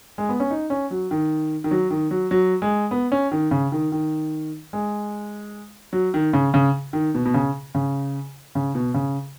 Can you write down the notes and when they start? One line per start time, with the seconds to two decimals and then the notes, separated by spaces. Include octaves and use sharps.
0.18 G#3
0.29 B3
0.40 C#4
0.50 D#4
0.70 C#4
0.91 F#3
1.11 D#3
1.64 D#3
1.71 F#3
1.91 D#3
2.11 F#3
2.31 F#3
2.62 G#3
2.91 B3
3.12 C#4
3.32 D#3
3.51 C#3
3.72 D#3
3.92 D#3
4.73 G#3
5.93 F#3
6.14 D#3
6.33 C#3
6.54 C#3
6.93 D#3
7.14 B2
7.25 B2
7.34 C#3
7.75 C#3
8.55 C#3
8.75 B2
8.94 C#3